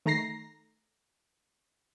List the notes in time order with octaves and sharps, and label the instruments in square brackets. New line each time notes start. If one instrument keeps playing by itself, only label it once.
[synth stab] D#3 A3 A#5 A#6 C7